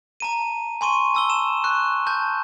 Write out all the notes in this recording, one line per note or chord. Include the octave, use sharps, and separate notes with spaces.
A5 A#5 D#7
G#5 C6 C#6 D#7
A5 E6 G7
E7
C#6 F#6
A5 G6